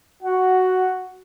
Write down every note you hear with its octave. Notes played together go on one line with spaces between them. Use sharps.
F#4 F#5